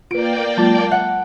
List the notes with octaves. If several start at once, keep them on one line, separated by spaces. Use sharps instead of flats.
A#3 F4 B4 D5 G5 D7
F#3 G#3 F4 A5
E5 F#5